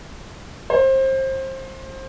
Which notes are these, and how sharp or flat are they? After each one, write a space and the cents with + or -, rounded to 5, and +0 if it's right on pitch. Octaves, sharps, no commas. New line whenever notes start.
C5 +25